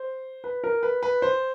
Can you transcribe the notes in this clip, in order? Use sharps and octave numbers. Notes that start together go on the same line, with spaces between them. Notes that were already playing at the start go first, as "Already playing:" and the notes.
Already playing: C5
B4
A#4
B4
B4
C5